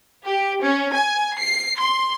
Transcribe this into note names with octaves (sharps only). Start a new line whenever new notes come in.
G4
C#4
G#5
C7
C6